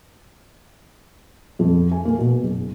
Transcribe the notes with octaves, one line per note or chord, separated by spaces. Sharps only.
F2
G#5
A#3
B2
F#1